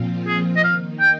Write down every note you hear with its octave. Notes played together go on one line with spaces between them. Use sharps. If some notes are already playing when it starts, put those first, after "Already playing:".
Already playing: A#2 F3 C4 F4
G#4
D#5
D#3 A#3 D#4 F5
G5